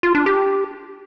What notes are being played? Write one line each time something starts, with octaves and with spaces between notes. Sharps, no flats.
F4
D4
G4